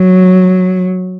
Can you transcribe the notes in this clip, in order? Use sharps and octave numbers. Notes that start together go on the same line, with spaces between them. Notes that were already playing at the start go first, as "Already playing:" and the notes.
Already playing: F#3